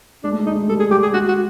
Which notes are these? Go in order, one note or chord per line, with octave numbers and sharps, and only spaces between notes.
G#3 D4
A3
G#3
A3 D#4
G#3
G3 A4
G#4
G3 G4
G#4
G#3 F#4
F#4